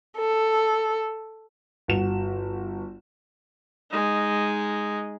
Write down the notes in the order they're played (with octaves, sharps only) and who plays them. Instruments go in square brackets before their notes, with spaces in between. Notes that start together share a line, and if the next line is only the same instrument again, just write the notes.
[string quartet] A4
[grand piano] G1 F#4 E7
[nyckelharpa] G#3 D#4